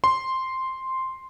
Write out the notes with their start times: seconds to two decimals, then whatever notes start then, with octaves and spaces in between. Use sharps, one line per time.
0.04 C6